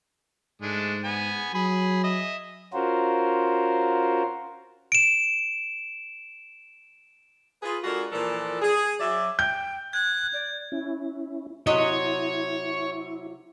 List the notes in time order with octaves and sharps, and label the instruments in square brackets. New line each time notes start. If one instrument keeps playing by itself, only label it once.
[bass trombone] G#2 [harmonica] G#3 A3 D4
[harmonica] B3 G#5
[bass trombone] F#3 [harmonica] G#4 B5
[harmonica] D#5 E5
[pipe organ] C#4 F4 F#4 A#4 C5
[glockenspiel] D7 E7
[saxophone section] F4 G#4 B4
G#3 D4 F4 F#4 A4 A#4
A#2 E3 F3 A4 A#4 D5
G#4
F#3 D5 E5
[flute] G5 [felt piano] G6
[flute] F#6 [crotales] G#6
[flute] D5
[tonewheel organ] C#4 E4
[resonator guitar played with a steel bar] C3 F#3 D#5 [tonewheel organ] E4 [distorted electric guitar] C#5